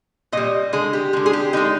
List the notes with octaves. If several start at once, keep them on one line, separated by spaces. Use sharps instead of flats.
A#2 G3 D#5
D3 G#3 G#4
G4
D3 G#3
G#4
G4
D3 G#3 D#4